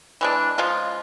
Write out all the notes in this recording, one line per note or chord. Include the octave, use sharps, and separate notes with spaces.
E3 G#3 D4
C#3 F3 G#3 F4